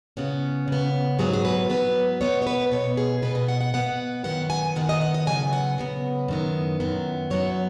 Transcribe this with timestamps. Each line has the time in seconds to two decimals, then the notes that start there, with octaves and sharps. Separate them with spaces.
0.17 C#3 B3 C#4
0.68 C#3 B3
1.19 G#2 F#3 B3 G#4
1.33 G#4
1.45 B4
1.70 G#2 F#3 B3 B4
2.21 B2 B3 C#5
2.42 C#5
2.47 B4
2.71 B2 B3 C#5
2.97 G#4
3.22 B2 B3 B4
3.35 D#5
3.48 F#5
3.61 F#5
3.74 B2 B3 F#5
4.24 F#2 D#3 B3 F#5
4.50 G#5
4.75 F#2 D#3 B3 F#5
4.89 D#5
5.01 F#5
5.14 D#5
5.27 C#3 F#3 B3 G#5
5.53 F#5
5.78 C#3 F#3 B3
6.28 F#2 D#3 B3
6.80 F#2 D#3 B3
7.30 F#2 F#3 B3 C#5